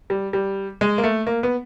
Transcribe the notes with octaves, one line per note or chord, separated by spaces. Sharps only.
G3
G3
G#3
A#3
A3
A#3
B3